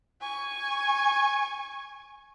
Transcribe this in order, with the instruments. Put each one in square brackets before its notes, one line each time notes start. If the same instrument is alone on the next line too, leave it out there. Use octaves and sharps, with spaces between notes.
[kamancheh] G#5 C#6